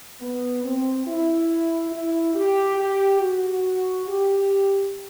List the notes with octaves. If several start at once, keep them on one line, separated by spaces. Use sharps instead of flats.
B3
C4
E4
E4
G4
G4
F#4
G4